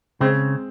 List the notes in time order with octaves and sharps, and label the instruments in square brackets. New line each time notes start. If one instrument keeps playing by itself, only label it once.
[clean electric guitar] C#3 [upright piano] G#3 C4